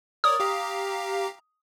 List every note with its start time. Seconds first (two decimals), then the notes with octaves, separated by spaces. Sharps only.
0.24 A#4 C#5 D5 D#6
0.40 G4 F5 A#5